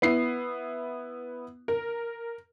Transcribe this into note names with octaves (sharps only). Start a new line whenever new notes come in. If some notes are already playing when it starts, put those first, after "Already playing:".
B3 E4 C7
A#4